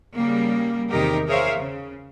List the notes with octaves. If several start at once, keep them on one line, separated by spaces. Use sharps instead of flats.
C#3 G3 A#3
E2 C3 D#3 D#4 G4 A#4
G#4 A#4 C5 C#5 E5 F5
C#3